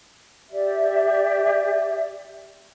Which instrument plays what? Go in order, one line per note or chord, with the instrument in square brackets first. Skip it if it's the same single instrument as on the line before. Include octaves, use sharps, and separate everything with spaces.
[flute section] G4 D5 E5